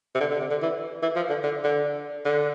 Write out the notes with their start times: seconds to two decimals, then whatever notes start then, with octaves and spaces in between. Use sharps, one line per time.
0.15 C3
0.21 D3
0.31 D3
0.41 C3
0.51 D3
0.62 E3
1.03 E3
1.16 F3
1.30 D3
1.44 D3
1.64 D3
2.26 D3